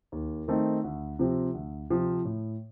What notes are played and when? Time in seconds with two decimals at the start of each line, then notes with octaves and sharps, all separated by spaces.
0.12 D#2
0.48 D#3 A3 C4 D#4
0.84 D2
1.19 C3 F3 C4
1.54 D2
1.90 C3 F3 C4
2.25 A2